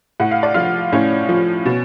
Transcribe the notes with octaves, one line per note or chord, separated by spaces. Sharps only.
A2 F#5
F5
D5
F3 F4 F5
A2 C#4 C#5
F3
B2